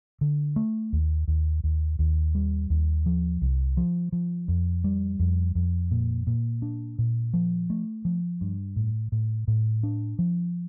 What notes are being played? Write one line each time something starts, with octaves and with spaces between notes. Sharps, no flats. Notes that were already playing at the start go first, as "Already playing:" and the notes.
D3
A3
D#2
D#2
D#2
D#2
G3
D#2
F3
C2
F3
F3
F2
G3
F2
F2
A#2
A#2
D4
A#2
F3
A3
F3
G2
A2
A2
A2
D4
F3